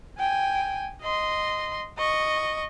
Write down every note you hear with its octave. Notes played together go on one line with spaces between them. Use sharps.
G5 G#5
D#5 C6
D#5 C#6